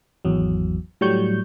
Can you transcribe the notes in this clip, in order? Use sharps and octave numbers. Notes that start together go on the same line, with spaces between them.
G#1 E2 F#3
A2 F#3 G3 C#6 G6